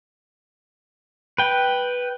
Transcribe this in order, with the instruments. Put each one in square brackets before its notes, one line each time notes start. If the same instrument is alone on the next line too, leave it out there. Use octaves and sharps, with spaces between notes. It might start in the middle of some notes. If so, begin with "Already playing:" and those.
[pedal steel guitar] B4 G5